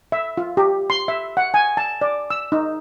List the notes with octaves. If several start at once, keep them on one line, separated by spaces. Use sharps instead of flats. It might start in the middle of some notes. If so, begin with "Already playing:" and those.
E5
F4
G4
C6
E5
F#5
G#5
A5
D5
E6
D#4